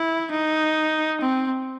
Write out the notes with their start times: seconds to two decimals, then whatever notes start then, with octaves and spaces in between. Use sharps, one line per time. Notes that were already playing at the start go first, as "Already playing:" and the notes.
Already playing: E4
0.31 D#4
1.21 C4